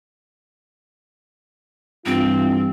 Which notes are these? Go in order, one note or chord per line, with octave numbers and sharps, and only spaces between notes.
G2 E3 C4 F4